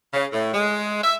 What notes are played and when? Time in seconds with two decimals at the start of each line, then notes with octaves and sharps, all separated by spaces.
0.14 C#3
0.33 A2
0.53 G#3
1.03 E5